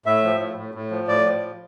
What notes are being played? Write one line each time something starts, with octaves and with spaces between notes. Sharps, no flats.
A2 E5
F3
A2
A2
A2
F3
A2 D5
F3